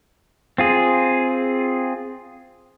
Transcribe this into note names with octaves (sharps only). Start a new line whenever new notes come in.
C4 F4 G#4